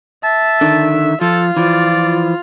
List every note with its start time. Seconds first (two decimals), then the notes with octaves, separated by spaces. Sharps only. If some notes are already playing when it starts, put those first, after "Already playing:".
0.24 E5 A5
0.61 D3 D#3
1.21 F3 F4 A4
1.57 E3 F3 D5